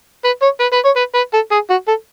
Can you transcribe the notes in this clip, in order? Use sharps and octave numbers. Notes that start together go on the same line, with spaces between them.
B4
C#5
B4
B4
C#5
B4
B4
A4
G#4
F#4
A4